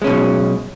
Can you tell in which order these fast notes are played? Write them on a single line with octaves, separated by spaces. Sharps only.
G#3 C#4 B2 F#3